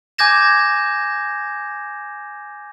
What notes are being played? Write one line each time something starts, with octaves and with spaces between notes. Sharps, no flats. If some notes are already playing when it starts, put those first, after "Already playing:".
G#5 D6 G6 G#6 A#6 E7